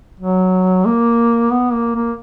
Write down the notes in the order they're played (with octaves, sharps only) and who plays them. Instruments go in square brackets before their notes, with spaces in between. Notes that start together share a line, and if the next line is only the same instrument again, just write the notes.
[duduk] F#3
A#3
B3
A#3
A#3